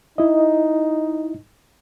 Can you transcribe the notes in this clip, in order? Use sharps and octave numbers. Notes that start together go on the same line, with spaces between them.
D#4 E4 D#5